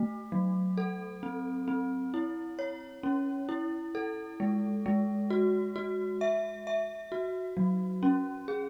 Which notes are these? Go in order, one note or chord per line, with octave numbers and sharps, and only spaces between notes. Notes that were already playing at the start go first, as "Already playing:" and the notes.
Already playing: A3
F#3
A4
C4
C4
E4
C#5
C#4
E4
A4
G#3
G#3
F#4
F#4
E5
E5
F#4
F#3
C#4
G#4